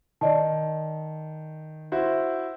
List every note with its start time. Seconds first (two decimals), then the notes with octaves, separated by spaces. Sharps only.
0.21 D#3 D5 D#5 A5
1.92 E4 F#4 C5